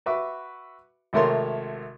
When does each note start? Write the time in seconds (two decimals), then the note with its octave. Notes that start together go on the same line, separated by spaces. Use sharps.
0.06 F#4 B4 E5 C#6 D6
1.13 G#1 C3 A3 A#4 C#5 C6